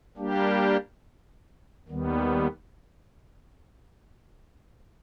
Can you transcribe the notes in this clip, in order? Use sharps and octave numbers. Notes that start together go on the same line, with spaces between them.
G3 A#3 D4 G4
D#2 D#3 G3 B3